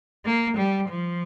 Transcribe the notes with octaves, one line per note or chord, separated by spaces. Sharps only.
A#3
G3
F3